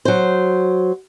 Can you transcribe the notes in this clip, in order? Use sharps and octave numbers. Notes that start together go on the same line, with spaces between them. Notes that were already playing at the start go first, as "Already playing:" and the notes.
F#3 C5